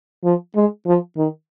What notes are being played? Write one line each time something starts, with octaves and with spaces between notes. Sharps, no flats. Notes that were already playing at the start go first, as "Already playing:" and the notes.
F3
G#3
F3
D#3